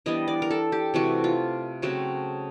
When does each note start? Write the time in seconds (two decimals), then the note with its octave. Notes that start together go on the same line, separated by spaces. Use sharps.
0.06 E3 G3 B3 D4 D#5
0.28 D5
0.42 A#4
0.51 A4
0.72 G4
0.94 C3 E3 A3 F#4
1.24 F4
1.82 C#3 F#3 A3 C4 F#4